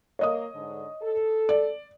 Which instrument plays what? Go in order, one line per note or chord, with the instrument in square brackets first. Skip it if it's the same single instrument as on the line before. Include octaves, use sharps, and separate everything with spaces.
[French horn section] A#3 [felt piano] C#5 D#5 D#6
[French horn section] G#2 D3
A4
[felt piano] D5